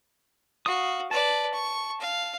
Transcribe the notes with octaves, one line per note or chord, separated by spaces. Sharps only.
F#4 F5 D#6
B4 D5 A5
C#6
F5